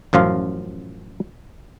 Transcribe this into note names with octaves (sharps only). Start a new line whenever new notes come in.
A1 F#2 F3 F4 F5